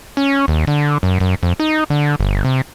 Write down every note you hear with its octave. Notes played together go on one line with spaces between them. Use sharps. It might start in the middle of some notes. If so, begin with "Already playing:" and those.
C#4
D#2
D3
F#2
F#2
F2
D#4
D3
G1
C3